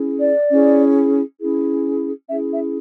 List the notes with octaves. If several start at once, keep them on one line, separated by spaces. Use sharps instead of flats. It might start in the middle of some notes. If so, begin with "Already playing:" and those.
Already playing: C#4 E4 G#4
D5
C#4 E4 G#4
C#4 E4 G#4
C#4 E4 G#4 E5
E5